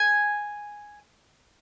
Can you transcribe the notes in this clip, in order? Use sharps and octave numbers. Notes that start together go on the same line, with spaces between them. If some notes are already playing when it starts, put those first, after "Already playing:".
Already playing: G#5